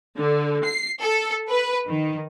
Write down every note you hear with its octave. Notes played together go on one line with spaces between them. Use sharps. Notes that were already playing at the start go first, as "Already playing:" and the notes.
D3
C7
A4
B4
D#3